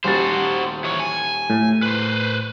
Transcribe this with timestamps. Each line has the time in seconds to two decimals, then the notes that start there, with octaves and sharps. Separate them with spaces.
0.04 D#1 G3 F#4 C5 A6
0.84 E3 C#5
1.00 G#5
1.50 A2
1.83 B4 C5